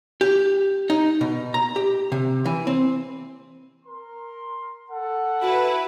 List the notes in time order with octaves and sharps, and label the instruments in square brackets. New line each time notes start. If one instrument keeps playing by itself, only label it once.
[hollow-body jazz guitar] G4
D#4
B2
A#5
G4
C3
E3
C4
[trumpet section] A#4 C6
A4 F#5
[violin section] E4 B4 [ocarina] F#4